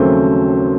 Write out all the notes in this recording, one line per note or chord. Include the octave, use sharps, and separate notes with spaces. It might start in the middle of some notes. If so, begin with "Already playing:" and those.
Already playing: D#2 C#3 F#3 A3 C4 C5